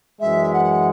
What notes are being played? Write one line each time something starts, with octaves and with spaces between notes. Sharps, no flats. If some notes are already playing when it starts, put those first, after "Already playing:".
F#2 E3 G#3 E5
F#5